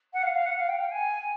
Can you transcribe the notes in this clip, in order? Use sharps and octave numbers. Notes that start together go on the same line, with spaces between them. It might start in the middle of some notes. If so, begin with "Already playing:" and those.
F#5
F5
F5
F#5
F5
G5
G5
G#5